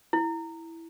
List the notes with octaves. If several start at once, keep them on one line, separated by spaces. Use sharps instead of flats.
E4